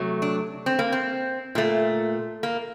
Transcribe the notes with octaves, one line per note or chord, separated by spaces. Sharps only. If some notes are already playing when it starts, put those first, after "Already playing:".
Already playing: C3 F#3 A3
D4
C4
A#3
C4
A#2 A3
A#3